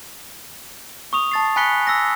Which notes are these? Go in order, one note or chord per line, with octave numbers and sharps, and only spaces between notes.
C#6 D#6 F7
A5 A6 C7
G#5 B5 F#6 B6 C#7 G7
E6 A#6